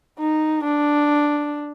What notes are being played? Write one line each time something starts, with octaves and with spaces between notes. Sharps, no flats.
D#4
D4